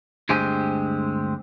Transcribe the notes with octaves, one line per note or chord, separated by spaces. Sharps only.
D2 G2 G#3 C4 G4 G#5